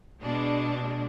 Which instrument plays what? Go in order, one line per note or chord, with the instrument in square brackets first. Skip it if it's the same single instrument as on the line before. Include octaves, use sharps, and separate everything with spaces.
[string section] B2 G#3 D4